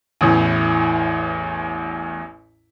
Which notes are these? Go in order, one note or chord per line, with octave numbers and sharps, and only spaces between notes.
A1 E2 A2